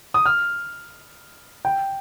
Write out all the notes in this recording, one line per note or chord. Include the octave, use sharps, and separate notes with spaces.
D#6
F6
G5